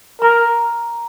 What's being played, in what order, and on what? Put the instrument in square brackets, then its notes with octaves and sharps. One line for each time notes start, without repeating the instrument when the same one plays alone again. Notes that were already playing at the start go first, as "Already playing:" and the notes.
[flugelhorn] A#4 [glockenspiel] A#5